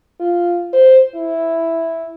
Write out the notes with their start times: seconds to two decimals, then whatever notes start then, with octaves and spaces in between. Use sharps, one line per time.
0.20 F4
0.73 C5
1.15 E4